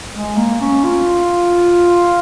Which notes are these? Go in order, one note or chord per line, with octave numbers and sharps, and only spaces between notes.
G#3
A#3
C#4
F4